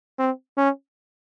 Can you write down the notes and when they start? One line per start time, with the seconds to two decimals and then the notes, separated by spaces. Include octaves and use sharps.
0.19 C4
0.57 C#4